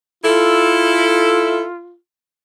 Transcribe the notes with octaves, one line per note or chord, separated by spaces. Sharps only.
E4 F4 A4